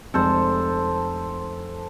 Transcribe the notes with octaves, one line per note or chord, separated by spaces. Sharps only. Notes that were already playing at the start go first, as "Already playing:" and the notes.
F1 G#3 C4 A4 C5